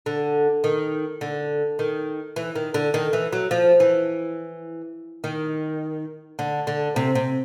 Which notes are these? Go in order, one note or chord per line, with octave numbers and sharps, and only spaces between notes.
D3
D#3
D3
D#3
E3
D#3
D3
D#3
E3
F#3
F3
E3
D#3
D3
D3
C3
C3